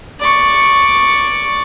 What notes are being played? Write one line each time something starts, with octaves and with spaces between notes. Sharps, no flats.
D5 C#6